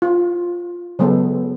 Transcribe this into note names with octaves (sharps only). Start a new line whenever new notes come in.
F4
C#3 F#3 G#3 B3 A4